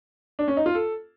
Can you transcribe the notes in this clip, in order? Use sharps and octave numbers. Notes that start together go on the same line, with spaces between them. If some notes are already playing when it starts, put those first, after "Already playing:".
D4
C#4
D#4
F4
A4